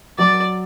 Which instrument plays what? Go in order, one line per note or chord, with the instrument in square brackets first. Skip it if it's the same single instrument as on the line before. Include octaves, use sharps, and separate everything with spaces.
[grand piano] F#3 [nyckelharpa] D5